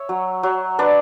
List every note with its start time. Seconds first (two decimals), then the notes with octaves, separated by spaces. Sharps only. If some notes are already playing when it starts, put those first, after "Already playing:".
Already playing: C#5 E5
0.09 F#3
0.43 F#3
0.79 D4 B4 D5